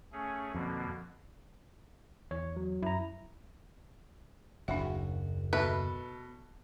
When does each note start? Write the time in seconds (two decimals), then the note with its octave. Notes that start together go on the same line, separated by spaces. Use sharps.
0.12 A3 C#4 G#4
0.54 F2 B2 D3 A#3
2.31 E2 C#5
2.56 F#3
2.83 F#2 E4 A#5
4.68 F#1 D#2 D4 F#4 E5
5.53 B2 A4 B4 E5